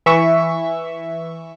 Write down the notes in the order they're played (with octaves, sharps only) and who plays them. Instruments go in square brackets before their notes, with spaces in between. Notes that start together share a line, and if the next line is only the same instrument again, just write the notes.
[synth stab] E3 E5 C#6